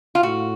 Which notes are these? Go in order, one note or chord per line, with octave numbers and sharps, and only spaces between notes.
F4
A2 F#4